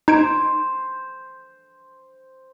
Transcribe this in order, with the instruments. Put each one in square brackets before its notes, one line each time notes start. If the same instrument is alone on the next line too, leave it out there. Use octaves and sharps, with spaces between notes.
[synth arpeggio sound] D#4 G#6 D7 [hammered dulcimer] C5